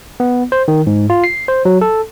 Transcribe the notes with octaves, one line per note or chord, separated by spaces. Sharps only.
B3
C5
D#3
G#2
F4
C7
C5
F#3
A4